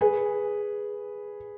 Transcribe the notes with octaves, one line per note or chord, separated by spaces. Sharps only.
G#4 B4